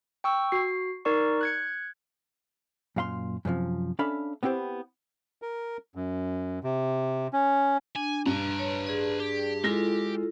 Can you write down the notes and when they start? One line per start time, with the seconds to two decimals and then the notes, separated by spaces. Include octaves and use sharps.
0.24 G5 C#6 E6
0.52 F#4 C7
1.05 D#4 A#4 D5 C#6
1.41 F#6 G#6 C#7
2.96 F#2 A#2 F5 B5 C6
3.45 F#2 C3 E3 F3
3.99 C#4 D4 A4 E5 F5 B5
4.43 B3 C4 E4 G4 C5
5.42 A#4
5.95 F#2
6.64 C3
7.33 C#4
7.96 D4 G#5
8.26 G2 B4 A#5
8.59 C#5
8.87 G#4 D5
9.20 G4
9.64 G#3 E4 F4 A4 A#6